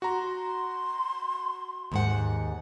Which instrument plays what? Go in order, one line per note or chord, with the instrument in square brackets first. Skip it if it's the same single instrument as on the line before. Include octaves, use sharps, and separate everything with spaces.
[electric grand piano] F#4 A#5 [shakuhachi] C6
[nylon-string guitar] D#2 G#2 F#5